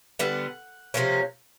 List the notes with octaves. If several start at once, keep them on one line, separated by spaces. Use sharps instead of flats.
D3 G3 B3 F#5
C3 F3 A#3 C#4